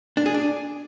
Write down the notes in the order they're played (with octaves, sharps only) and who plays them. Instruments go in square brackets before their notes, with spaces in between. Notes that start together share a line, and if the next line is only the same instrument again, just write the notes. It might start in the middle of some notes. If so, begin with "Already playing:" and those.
[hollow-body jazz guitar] D4
G#4
D4